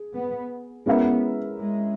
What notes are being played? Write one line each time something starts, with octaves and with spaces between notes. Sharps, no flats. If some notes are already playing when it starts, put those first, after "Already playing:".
Already playing: G#4
B3
G#3 B3 C#4 E4 A#4 E5
G#3